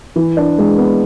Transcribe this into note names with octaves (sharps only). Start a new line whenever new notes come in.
E3
D4
G#3
B3